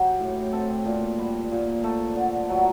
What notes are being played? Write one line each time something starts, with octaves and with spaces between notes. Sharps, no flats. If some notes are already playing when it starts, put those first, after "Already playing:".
Already playing: F#3 G4
A2
C4 A4
A#2
G3
A#2
A3 A4
D3
F#3